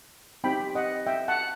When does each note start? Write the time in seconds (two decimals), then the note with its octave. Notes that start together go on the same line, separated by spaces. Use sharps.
0.44 C4 D#4 G4 G5 B5
0.75 D#5 F#5
1.07 E5 G5
1.28 F#5 A5